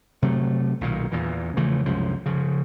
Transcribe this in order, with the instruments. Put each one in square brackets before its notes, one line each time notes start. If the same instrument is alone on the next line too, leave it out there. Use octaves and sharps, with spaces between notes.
[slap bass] C3 F#3 A3
B1 A#2 D#3
E2 A#2 E3
C#3 E3 F3 A3
C2 F#2 F3 G#3
C#3 F3